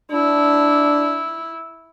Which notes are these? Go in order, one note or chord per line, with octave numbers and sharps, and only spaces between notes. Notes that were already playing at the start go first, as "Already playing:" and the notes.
D4 E4